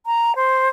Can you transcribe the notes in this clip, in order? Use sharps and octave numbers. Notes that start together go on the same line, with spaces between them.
A#5
C5